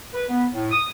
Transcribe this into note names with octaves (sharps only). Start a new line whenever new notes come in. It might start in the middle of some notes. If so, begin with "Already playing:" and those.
B4
B3
A2
D#6